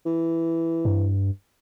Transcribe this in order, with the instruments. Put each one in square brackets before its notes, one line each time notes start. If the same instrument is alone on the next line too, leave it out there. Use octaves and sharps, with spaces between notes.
[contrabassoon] E3
[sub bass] G2